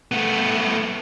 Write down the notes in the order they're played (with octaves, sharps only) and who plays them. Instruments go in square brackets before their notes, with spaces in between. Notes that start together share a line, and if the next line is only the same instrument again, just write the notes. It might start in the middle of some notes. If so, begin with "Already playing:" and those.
[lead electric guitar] A3 B3